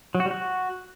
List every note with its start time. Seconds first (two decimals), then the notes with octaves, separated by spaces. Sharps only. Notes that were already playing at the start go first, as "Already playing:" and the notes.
0.15 F#3
0.20 F#4
0.25 G3
0.31 F#4